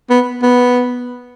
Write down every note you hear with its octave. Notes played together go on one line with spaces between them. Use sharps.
B3
B3